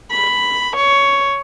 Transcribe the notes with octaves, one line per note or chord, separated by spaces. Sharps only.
B5
C#5